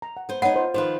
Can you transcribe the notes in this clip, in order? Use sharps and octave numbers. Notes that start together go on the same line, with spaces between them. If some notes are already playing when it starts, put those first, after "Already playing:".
A#5
F#5
B3 C5
B3 D#4 C#5 F#5 B5
F4 C5
D#3 F3 B4 C5 F5